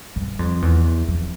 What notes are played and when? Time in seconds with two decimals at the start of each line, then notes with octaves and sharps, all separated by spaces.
0.16 G2
0.39 F2
0.62 E2
1.08 F2